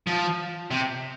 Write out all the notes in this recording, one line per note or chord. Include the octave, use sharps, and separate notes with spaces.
F3
C3